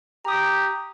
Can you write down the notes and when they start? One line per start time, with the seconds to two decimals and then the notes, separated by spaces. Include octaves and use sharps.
0.25 G4 A#5 D#6